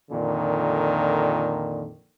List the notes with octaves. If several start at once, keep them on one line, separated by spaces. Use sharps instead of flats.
F2 A#2 D3 D#3